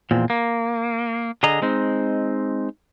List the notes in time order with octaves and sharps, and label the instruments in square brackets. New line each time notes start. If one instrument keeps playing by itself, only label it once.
[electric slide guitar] E2 A#2 F3 C4
A#3
D3 G#4 D#5 A#5
G#3 C4 D#4